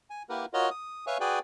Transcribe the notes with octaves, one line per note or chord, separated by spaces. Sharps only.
G#5
A#3 E4 G4 A#4 B4 F#5
F4 F#4 A#4 C#5 D#5 F#5
D#6
B4 C#5 E5 F5 G#5 C#6
F#4 G#4 B4 D5 G5 G#5